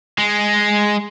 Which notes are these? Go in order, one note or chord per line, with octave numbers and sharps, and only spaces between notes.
G#3